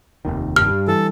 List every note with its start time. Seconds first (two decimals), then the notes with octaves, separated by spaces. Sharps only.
0.25 F1 D#2 D#3
0.56 G2 F6
0.88 E3 A4